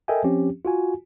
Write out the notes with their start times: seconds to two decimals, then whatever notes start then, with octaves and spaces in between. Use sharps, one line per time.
0.08 A4 A#4 D#5 E5 G5 G#5
0.24 F3 C4 C#4 G4
0.65 F4 F#4 G#5